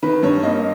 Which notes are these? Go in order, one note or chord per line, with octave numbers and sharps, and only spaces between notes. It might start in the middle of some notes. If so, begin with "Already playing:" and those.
D#3 B4
G2 C#5
A#3 D#5